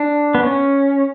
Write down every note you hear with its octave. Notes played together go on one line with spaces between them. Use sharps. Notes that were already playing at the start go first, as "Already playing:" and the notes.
Already playing: D4
B3
C#4